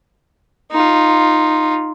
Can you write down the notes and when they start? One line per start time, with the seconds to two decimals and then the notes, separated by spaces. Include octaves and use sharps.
0.72 D#4 F4